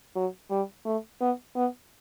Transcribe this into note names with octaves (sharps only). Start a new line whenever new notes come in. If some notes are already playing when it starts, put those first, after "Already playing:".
F#3
G3
A3
B3
B3